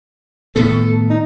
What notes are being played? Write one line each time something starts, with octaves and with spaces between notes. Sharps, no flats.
A2 D#3 B3 A4
D#4